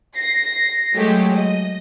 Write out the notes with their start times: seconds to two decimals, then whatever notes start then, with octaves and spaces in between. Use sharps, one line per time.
0.15 A#6 C7
0.93 F#3 G#3 A3 G4
1.35 D#5